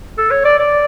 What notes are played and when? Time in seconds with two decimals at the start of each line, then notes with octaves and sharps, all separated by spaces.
0.18 A4
0.31 C#5
0.45 D5
0.59 D5